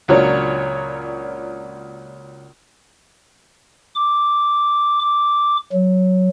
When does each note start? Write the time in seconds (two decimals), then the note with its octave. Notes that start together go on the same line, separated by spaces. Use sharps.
0.08 C#2 A#2 F#3 A#3 D4 C#5
3.96 D6
5.01 D6
5.72 F#3